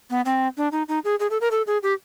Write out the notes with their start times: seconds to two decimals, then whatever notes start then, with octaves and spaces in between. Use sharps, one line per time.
0.10 B3
0.25 C4
0.57 D4
0.72 D#4
0.88 D#4
1.04 G#4
1.20 G#4
1.30 A4
1.41 A#4
1.51 A4
1.67 G#4
1.83 G4